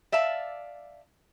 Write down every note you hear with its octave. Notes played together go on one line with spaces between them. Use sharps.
D5 E5 F5 A5